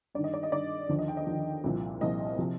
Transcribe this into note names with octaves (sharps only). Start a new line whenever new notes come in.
G2 D#3 D5
D#5
D5
D#5
G2 D#3 D5
D#2 D3 F3
D#5
G5
D#5
D#2 D3 F3
C2 A#2 F3
C2 A#2 F3 D#5
C3 F3